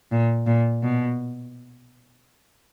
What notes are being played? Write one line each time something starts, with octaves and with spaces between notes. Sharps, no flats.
A#2
A#2
B2